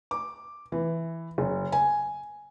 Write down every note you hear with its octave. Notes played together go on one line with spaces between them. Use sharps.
D6
E3
F#1
G#5